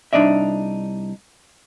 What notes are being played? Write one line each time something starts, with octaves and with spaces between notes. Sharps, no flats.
C2 A#2 D4 D#4 D5 E5